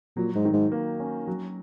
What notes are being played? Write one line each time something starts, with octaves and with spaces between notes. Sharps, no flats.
A#2 F#3
G#2
D#3
G#2
A#3
C#4
F#3